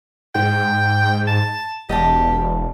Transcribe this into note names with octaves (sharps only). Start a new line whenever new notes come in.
G#2 G5
A5
E1 G4 D#5 F5 A5